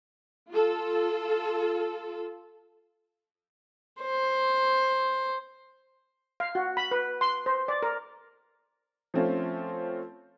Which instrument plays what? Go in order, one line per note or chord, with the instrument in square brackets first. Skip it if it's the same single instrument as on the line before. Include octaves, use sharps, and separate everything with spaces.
[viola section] F4 A4
[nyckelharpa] C5
[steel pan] F5
F#4
B5
B4
C6
C5
D5
A#4
[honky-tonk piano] F3 A3 C4 C#4 F4